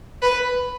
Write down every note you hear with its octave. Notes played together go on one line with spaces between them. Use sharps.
B4